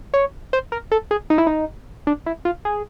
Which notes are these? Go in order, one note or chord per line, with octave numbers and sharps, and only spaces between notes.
C#5
C5
A#4
A4
G#4
D#4
E4
D#4
D4
E4
F4
G#4